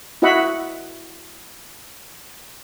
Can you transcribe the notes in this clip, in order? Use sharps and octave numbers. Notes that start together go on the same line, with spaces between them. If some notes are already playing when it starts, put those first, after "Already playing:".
E4 F#4 D#5 E5 F#5 B5